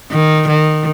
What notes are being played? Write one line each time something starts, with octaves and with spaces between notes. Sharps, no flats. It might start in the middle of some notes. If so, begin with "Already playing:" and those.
D#3
D#3